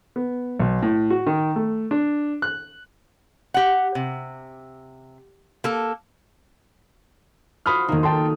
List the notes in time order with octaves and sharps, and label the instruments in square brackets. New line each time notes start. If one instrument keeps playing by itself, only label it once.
[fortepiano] B3
B1
A2
F#4
D#3
A3
D4
F#6
[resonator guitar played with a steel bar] G4 F#5
C3
A#3 A4
[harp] F4 F#4 C5 [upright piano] B5 D#6 F6
[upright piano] E1 D#4 [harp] D#3 A#3
[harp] A4 [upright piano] G5 A5 C6